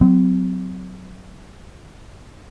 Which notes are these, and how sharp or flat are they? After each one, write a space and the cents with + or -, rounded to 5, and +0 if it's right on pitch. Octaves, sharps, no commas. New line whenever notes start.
F#3 +0 C4 -35